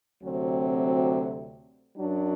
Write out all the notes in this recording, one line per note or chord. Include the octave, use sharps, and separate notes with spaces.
D2 C3 F#3 C4
F#2 F#3 D4